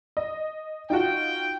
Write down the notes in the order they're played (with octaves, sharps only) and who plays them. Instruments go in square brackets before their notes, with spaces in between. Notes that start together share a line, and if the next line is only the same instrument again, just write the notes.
[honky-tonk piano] D#5
[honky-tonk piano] D#4 F4 F#4 [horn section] G5